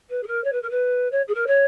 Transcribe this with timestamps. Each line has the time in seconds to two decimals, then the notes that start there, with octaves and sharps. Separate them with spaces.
0.10 B4
0.23 G#4
0.27 A#4
0.44 C#5
0.52 B4
0.62 A#4
0.70 B4
1.12 C#5
1.28 G#4
1.34 A#4
1.47 C#5